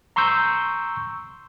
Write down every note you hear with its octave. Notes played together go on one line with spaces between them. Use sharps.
A#5 C6 C#6 E6 G6